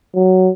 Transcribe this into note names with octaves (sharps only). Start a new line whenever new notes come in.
F#3